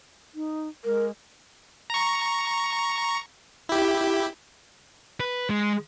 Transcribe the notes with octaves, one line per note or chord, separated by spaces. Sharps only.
D#4
G#3 A#4
A#5 C#6
E4 G4
B4
G#3